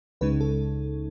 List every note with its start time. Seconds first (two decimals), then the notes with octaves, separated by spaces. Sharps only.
0.21 C#2 C#3 G#3 D#4 B4
0.41 A4